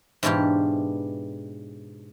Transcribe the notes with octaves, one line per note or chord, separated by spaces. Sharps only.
G#2 B2 E3 D4 F4 G4